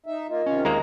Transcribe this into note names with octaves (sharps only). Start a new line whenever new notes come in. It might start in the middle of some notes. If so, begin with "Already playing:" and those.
D#4 E5
A#3 F4 D#5
C3 D#3 C#4 F4
D#2 G#3 A#3 A#5